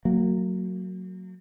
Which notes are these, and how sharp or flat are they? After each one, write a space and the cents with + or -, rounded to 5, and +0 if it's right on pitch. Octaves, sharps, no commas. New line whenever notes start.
F#3 +0 A#3 -35